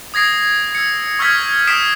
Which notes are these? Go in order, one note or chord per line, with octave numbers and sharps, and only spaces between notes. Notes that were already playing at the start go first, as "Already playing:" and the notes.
D#6 G#6 A#6 C7 D7
E6 C#7
C#6 E6 F6 G6 G#6 B6
D#6 B6 C7 D7 E7